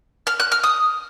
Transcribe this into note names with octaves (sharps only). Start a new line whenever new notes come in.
F6
F#6
F6
D#6